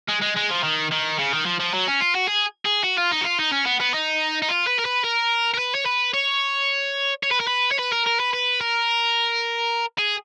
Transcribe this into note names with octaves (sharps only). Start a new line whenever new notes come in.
G#3
G#3
G#3
F3
D#3
D#3
C#3
D#3
F3
F3
F#3
C#4
F4
F#4
G#4
G#4
F#4
F4
D#4
F#4
F4
D#4
C#4
B3
B3
D#4
D#4
F4
B4
A#4
B4
A#4
A#4
B4
C#5
B4
C#5
C#5
B4
A#4
B4
C#5
B4
A#4
A#4
B4
B4
A#4
G#4